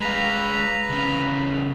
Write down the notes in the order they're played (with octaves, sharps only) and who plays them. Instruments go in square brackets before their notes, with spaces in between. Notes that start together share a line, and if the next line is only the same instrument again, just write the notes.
[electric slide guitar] G#3 G#4 F5 [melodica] B4 A#5
[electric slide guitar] C#3 E3 C#4